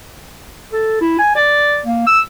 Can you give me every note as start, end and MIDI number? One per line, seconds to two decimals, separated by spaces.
0.72 0.96 69
1.01 1.16 64
1.19 1.34 80
1.35 1.80 74
1.86 2.05 58
2.07 2.20 88